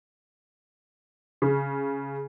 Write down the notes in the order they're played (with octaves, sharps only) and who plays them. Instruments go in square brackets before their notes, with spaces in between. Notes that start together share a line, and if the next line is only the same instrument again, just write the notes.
[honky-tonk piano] C#3